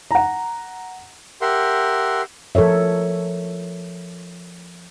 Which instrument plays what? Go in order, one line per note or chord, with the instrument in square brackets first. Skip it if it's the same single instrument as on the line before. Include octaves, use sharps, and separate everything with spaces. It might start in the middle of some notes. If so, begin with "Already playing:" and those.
[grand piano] F#5 A#5
[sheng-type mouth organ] G4 A#4 E5 F#5 C6
[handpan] F3 A4 A#4 C#5 E5